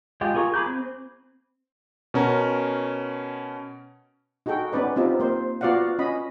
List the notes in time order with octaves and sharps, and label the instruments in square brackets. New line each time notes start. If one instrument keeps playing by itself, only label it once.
[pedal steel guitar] G#3 F4 G4
F4 G#4 A#4 C#6
G#4 B5 D6 G6
C4
[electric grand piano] B2 C#4 A#4
[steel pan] D#4 F#4 G#4 A4 G5
B3 C#4 D#4 B4 D5
C4 D#4 F4 G4
A#3 C5
B3 F4 F#4 D5 F5 F#5
C#4 D#5 B5